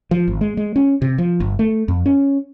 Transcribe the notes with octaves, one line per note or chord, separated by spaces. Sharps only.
F3
G#1
G#3
G#3
C#4
C3
F3
G1
A3
F2
C#4